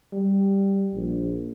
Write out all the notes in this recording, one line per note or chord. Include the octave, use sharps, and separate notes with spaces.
G3
A#1